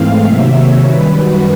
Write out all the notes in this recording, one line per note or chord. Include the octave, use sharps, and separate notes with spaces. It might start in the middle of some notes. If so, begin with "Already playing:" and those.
Already playing: G#2 E3 A3 C4 F5
C3 D#3 F#3 A#3 E5
C#5
F#2 D#3 G3 B4
F#4